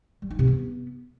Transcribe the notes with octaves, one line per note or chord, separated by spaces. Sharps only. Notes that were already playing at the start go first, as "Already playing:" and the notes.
G3
D#4
C3
B3